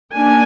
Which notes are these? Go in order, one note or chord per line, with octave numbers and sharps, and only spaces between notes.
A#3 D4 G#5